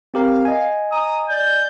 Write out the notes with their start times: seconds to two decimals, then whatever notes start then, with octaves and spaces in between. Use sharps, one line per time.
0.14 C4 G4 A#4 F5
0.45 D#5 G#5
0.91 A#5 D#6
1.29 D5 G6